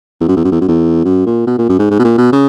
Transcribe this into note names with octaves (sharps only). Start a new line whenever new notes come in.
E2
F#2
E2
F#2
E2
F#2
E2
F#2
A#2
B2
A#2
F#2
G#2
G#2
B2
A#2
B2
C#3